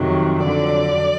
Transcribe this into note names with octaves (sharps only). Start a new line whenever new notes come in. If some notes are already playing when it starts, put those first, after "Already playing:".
Already playing: F2 C3 D#3 F#3
F2 D3 F#3 D5